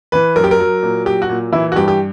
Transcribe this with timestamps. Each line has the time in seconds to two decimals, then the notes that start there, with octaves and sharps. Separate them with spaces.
0.12 E3 B4
0.36 F#2 A#4
0.44 G4
0.51 A#4
0.60 F#3
0.83 A#2
1.05 F#3 G4
1.22 F#4
1.29 A#2
1.52 E3 E4
1.72 F#4
1.76 G2 G4
1.88 G4